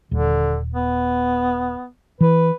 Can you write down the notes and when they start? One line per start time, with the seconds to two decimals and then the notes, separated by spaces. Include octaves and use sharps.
0.11 D#1 D3
0.74 B3
2.21 E3 B4